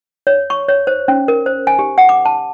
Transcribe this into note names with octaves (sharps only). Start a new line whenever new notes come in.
C#5
C#6
C#5
C5
C#4
A#4
C5
G#5
G4
F#5
D6
A5